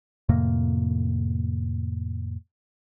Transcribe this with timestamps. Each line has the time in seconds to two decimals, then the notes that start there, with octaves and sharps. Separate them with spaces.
0.29 F2 A2 C3 A#3